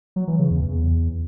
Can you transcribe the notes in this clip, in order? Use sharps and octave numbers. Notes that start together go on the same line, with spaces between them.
F#3
E3
C#3
E2
E2